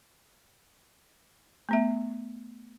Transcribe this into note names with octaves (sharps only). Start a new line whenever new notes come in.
A3 B3 E5